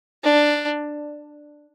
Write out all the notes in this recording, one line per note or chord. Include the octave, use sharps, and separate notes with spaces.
D4